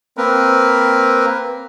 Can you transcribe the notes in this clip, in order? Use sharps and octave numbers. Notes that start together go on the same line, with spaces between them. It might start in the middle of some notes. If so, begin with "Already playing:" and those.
A#3 C4 A#4 B4